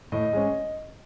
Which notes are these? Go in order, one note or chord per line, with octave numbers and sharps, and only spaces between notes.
A2 D#5
G#3 C#4